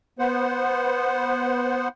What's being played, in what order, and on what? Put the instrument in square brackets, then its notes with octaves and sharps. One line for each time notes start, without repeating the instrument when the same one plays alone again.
[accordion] B3 C5 F#5